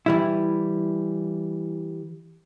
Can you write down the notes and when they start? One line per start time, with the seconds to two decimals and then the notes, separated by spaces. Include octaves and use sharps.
0.06 E3 G3 E4